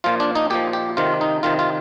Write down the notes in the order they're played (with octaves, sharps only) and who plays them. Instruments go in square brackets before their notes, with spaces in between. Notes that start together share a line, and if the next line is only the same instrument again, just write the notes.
[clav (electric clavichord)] A#2 F3 F4
D4
D#4
A#2 F3 G4
G4
C3 D#3 F4
D#4
C3 D#3 F4
F4